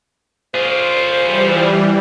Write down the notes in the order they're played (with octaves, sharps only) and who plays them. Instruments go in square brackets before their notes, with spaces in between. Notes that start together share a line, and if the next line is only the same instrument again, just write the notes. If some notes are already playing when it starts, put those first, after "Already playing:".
[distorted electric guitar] F4 G#4 [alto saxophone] C5
[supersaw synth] E3 G3